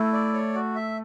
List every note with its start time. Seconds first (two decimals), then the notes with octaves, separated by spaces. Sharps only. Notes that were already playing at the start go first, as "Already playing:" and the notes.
Already playing: A3 E4
0.13 D5
0.34 C#5
0.54 F#4
0.76 E5